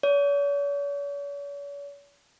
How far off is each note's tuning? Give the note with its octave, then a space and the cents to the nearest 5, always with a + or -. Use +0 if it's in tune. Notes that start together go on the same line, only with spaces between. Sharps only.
C#5 +45